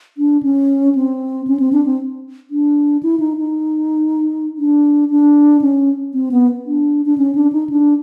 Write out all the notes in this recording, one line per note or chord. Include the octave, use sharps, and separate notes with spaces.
D4
C#4
C4
C#4
C4
D4
C4
D4
E4
D#4
D#4
D4
D4
C#4
C4
B3
D4
D4
C#4
D4
D#4
D4